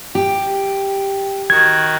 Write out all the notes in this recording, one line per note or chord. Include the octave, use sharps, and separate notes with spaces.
G4
D#3 F#4 G#6